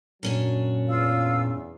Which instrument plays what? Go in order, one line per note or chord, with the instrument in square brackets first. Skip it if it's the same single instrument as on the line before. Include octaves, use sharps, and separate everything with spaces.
[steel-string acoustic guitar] F#2 C#4 D4 [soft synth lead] A#2 [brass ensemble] F#3
[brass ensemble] E2 [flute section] F4 F5 E6